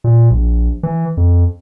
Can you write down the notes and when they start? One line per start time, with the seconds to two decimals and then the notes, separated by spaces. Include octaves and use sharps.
0.04 A#2
0.31 A#1
0.83 E3
1.17 F2